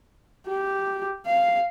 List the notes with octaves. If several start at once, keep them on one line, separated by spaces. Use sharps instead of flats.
G4
F5